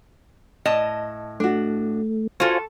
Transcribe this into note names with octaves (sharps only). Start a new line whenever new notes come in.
A2 D#5 A5
A3 D4 F#4
F4 F#4 A4 C5 F5 G#5